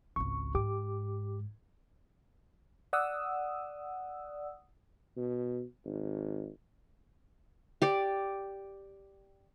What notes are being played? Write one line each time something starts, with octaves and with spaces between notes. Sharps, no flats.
G#1 C#2 C#6
G#2 G4 D6
D5 F#5 D#6 E6
B2
G#1
G4 D5